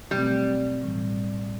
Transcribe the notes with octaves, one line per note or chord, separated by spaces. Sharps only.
B2 F#3 G3 A3 C4
A2 E3 G3